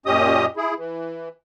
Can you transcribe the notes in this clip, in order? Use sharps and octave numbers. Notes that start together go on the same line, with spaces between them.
F#2 A#2 C#4 G4 D#5 D#6
E4 G#4
E3